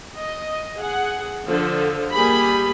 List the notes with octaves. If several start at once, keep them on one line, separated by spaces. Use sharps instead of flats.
D#5
G#4 F#5
D3 F3 A4
G3 A#3 G4 G#4 B5